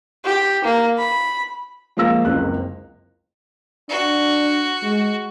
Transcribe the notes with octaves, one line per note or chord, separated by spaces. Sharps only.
G4
A#3
B5
F3 G#3 A#3 F5 E6 A#6
F#1 C#2 C4 F#6
D4 F#4
G#3